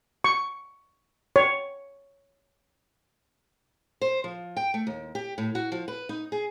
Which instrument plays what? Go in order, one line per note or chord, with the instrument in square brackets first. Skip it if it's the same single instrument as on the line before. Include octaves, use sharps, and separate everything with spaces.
[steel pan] C#6
C#5
[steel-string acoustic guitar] C5
F3
G5
A3
D#2
G4
A2
F#4
F3
B4
D#4
G#4